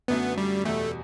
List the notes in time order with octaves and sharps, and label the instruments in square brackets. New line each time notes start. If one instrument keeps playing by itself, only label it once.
[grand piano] F#2 D3 F#3 A3 [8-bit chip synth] B3
[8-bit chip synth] G3
[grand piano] E2 B2 G3 [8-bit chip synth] A3